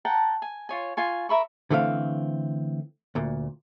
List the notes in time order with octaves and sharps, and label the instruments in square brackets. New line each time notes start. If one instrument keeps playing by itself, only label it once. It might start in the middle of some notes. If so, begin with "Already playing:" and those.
[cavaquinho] F#5 G5 A5 A#5
G#5
F4 C#5 G#5
F4 G#5 C#6
A#4 E5 B5 C#6
[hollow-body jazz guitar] D3 E3 A3 C4 F5
D2 A#2